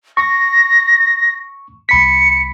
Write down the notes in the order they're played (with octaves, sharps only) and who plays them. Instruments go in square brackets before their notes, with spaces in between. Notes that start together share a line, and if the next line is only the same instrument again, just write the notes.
[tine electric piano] C#6 [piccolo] A#6
[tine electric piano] C2 B5 B6 [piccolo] C#7